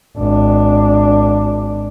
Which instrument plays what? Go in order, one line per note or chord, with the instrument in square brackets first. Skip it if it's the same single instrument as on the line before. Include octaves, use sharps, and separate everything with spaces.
[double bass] G#1 D4